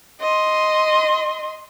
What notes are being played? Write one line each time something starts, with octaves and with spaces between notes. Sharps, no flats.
D#5 C6